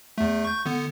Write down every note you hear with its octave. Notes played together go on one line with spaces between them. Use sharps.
E2 A3
C#6 G6
D3 B3